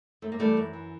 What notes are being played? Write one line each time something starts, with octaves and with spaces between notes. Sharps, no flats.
F#2 A3
A#3
E3 G3 A3
F#2
E3